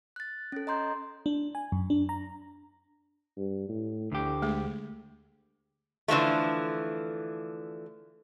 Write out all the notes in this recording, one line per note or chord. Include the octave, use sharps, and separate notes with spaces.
F#6 A6
C#4 A4
D#5 A#5 C6 G6
D4
G#5
F#2
D4
A#5
G2
A2
D2 D3 G4
G#3 A3 G#4
D3 E3 F3 A3